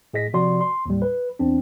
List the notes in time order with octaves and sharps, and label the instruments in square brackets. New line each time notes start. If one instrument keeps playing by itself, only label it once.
[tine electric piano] A2 G#4 D#5 A#6 B6
C3 F3 F#4 D5 C6
C6
D#2 A2 G3
B4
E2 C4 D4